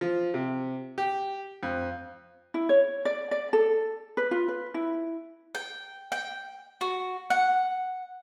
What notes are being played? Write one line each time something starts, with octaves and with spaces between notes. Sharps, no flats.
F3
C3
G4
F2
E4
C#5
D5
D5
A4
B4
F4
B4
E4
G5
G5
F#4
F#5